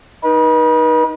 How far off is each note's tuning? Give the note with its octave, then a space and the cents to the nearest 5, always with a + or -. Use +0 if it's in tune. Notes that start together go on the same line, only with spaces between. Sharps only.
D#4 +0 B4 -40